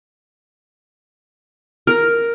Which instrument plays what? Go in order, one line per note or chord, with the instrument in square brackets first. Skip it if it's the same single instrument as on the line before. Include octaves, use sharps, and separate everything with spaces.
[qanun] A#4